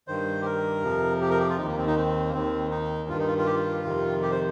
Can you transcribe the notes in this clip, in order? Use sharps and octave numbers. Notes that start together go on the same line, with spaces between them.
G2 D#3 C5
G4
A#4
F2 C3 F3
G4
A#4
G4
F4
D#2 D#3 D#4
A#3
C4
D#4
C4
A#3
D#2 D#3 C4
D#4
G2 D#3 F4
D#4
F4
F4
G4
F4
F2 C3 D#3
G4
C5